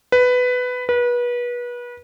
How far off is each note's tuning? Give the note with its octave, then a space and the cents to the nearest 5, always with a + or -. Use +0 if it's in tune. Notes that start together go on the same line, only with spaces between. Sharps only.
B4 +10
B4 -30